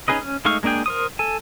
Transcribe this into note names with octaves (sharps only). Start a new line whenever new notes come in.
C#4 D#4 G#4 B4 D#5
C#4
G#3 A3 D#4 F5 C#6
G#3 A#3 D4 G#4 G5
A#4 C5 D#6
A4 G#5